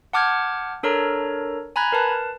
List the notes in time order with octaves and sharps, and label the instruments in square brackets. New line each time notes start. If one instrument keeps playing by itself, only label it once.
[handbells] F#5 A5 D6 F6 G6 G#6
D4 A4 A#4 C#5 A#5
G#5 A#5 B5 F#6 G#6
A#4 B4 A5